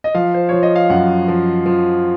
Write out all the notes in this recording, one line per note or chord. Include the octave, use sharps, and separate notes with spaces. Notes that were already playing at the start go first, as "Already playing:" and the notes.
D#5
F3 F5
C5
F3 C#5
D#5
F5
F#2 F#5
F3
F3